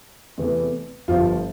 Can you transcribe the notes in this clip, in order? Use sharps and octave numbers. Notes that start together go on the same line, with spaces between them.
E2 C3 E3 A3
G1 G2 F3 F4